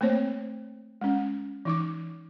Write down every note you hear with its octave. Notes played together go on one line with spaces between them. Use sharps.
A3 A#3 C4 C5 C#5
G#3 C#4
E3 D#4 D6